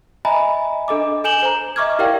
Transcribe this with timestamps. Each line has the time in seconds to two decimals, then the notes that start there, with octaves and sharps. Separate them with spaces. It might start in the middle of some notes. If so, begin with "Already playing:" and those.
0.25 D#5 E5 G#5 A#5 B5
0.88 D4 A4 D#5 D6
1.24 A4 G#5 G6 E7 F#7 G7
1.43 C5 A#5
1.76 D#5 E5 C#6 D6 F6 G#6
1.99 E4 G4 A#4 D5 F5 G5